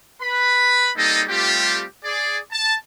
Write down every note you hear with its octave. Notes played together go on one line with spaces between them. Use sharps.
B4 B5
G3 A#3 C4 D#4 A4 D#5
G3 A3 C4 F4 G4
G#4 D5
A5